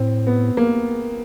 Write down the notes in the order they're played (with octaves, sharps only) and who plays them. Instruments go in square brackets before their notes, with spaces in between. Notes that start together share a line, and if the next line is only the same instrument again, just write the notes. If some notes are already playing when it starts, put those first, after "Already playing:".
Already playing: [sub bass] A2 [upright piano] C4
[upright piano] B3
A#3